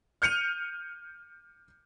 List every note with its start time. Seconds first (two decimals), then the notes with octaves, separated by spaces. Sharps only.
0.22 F6 G6 C#7 D#7 F7